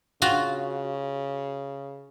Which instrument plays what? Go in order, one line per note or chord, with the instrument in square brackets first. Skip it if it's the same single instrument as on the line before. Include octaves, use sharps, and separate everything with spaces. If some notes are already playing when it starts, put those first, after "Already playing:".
[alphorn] C#3 [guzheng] F4 F#4